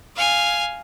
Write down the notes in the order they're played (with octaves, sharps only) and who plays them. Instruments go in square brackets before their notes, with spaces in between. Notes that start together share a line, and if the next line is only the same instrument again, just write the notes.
[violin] F5 G#5